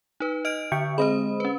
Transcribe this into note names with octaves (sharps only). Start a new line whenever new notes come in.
D#4 B4
D#5 F6 D7
D3 E5 G5 C#6
G#3 C4 C5 D#5 B5
C#4 B4